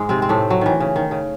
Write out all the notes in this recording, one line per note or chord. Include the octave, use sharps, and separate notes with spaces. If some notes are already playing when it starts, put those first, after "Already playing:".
Already playing: G#2 G#3
C3 C4
C4
A2 A3
F#3
D#3 E3
C#3
D#3
C#3